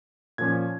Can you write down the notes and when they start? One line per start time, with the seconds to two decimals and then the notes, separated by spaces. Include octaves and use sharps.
0.38 A#2 F3 C#4 G#6